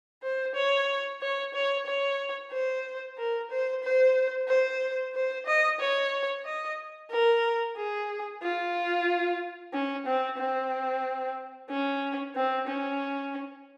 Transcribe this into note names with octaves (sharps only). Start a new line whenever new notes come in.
C5
C#5
C#5
C#5
C#5
C5
A#4
C5
C5
C5
C5
D#5
C#5
D#5
A#4
G#4
F4
C#4
C4
C4
C#4
C4
C#4